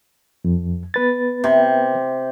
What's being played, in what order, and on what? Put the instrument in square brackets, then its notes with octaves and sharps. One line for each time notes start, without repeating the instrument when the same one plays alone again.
[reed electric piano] F2
B3 B4 A6
[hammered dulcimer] C3